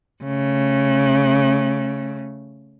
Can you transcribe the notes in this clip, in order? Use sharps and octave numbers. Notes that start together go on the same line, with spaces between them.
C#3 A3